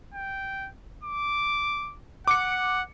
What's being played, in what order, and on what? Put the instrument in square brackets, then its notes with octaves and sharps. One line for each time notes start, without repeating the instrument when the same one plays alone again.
[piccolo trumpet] G5
D6
[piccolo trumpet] F#5 [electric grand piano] D6 C#7